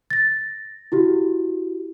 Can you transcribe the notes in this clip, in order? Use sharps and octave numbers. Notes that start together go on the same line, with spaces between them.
A6 A#6
E4 F#4 G4